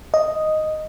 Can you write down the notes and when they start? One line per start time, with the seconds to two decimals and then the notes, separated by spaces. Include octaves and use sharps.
0.14 D#5